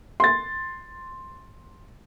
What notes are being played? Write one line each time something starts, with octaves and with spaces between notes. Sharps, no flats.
C6 A6